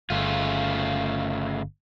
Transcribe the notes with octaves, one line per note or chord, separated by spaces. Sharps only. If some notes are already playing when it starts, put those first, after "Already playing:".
G1 C#3 A3 F4